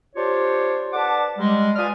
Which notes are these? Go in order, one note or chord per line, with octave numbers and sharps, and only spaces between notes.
D4 F4 G4 C5 C#5
D4 B4 F#5 A5 D6
G3 G#3
F4 B4 D5 G#5 D#6 F6